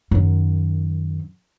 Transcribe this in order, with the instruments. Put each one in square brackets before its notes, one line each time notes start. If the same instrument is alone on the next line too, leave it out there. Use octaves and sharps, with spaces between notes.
[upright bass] F#2 D#3